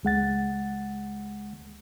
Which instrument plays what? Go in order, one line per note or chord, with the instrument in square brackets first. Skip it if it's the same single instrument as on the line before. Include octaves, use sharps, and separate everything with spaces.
[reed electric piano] C#2 G#3 F#5 A6